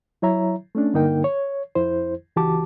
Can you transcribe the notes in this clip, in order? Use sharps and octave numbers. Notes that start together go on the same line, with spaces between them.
F#3 E4 C#5 E5 A#5
A3 C#4 D4
G2 D3 A#3 D#4 A#4 G5
C#5
F2 E4 C5
C#2 E3 F#4 G4 A5 D6